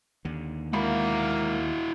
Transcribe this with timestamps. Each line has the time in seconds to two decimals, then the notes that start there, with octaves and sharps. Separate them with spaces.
0.25 D#2 D3
0.73 G#3 A#3 E4 F#4 B5